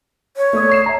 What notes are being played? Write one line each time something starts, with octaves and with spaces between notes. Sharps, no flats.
C#5
A3 D5 D#6
C#6 C7 E7
E5 A#5